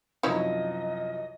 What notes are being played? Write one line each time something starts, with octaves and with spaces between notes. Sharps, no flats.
C2 F#2 F3 D#4 E4 C#5 D#5